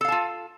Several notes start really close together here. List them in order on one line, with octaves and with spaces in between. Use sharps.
A4 F5 A5 F4